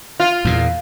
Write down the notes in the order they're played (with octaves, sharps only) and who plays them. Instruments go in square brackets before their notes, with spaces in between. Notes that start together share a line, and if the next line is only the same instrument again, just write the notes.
[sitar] F4
[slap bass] E2 A#2